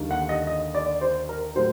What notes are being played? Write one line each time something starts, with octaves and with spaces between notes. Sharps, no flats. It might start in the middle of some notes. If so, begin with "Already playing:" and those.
Already playing: D#2 D3 G3 A#3 D#4
F#5
D#5
D#5
D5
C5
A#4
A2 F#3 C5